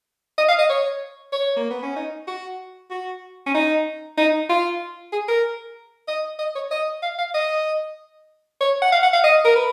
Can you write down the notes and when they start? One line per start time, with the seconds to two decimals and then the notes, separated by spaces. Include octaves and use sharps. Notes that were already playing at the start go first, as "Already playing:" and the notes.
0.38 D#5
0.48 F5
0.59 D#5
0.70 C#5
1.33 C#5
1.56 A#3
1.70 B3
1.83 C#4
1.96 D#4
2.27 F#4
2.91 F#4
3.46 C#4
3.54 D#4
4.18 D#4
4.49 F4
5.13 G#4
5.28 A#4
6.08 D#5
6.39 D#5
6.55 C#5
6.71 D#5
7.03 F5
7.18 F5
7.34 D#5
8.61 C#5
8.82 F#5
8.92 F5
9.03 F#5
9.13 F5
9.24 D#5
9.45 A#4
9.56 B4